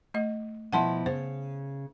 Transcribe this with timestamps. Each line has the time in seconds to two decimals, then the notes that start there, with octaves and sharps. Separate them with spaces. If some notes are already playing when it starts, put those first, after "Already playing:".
0.14 A3 D#5
0.73 B2 F3 E4 F#5 A5 C6
1.06 C#3 C5